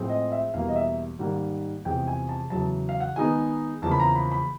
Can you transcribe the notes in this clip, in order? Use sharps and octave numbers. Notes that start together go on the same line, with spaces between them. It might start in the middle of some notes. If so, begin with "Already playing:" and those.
Already playing: A2 F3 G#3 C4
D#5
E5
E2 B2 G3 A#3 F5
D#5
E5
G#2 D#3 G3 A#3 F#5
E2 C3 F3 G#3 G5
G#5
A5
E2 C#3 F#3 A5
F5
F#5
D#3 G#3 B3 D#4 G#5
E2 C#3 F3 A#3 A5
B5
A#5
B5
B5